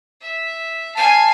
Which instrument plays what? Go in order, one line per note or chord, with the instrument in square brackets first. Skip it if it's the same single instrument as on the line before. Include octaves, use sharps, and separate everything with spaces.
[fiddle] E5
[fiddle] F5 G#5 [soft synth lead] A5